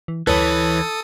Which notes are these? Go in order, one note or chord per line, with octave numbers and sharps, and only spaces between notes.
E3
D2 E3 A4 B4 C#5 A5 D#6